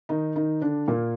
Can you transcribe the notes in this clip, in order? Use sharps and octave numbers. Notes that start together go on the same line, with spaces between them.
D#3 D#4
D#3 D#4
D3 D4
A#2 A#3